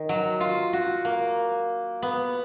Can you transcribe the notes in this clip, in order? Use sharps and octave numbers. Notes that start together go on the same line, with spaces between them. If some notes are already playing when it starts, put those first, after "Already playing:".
Already playing: D#3
F#3
F4
F#4
A#3
B3